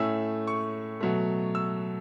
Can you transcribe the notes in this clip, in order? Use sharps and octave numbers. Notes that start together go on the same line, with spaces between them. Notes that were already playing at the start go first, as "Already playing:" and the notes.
Already playing: A2 A3 C#4 E6
C#6
B2 F#3 A3
E6